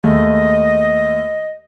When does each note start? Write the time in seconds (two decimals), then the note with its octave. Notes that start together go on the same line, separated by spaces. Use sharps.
0.04 D#2 G#3 A3 D#5